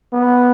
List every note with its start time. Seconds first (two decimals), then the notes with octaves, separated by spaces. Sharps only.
0.13 B3